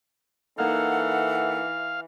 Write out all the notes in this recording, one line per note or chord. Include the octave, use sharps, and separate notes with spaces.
E3 A#3 D#4 A4 F5 F#5